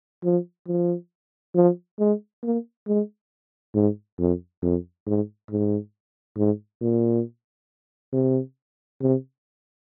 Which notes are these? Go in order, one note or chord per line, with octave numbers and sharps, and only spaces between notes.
F3
F3
F3
G#3
A#3
G#3
G#2
F2
F2
G#2
G#2
G#2
A#2
C3
C3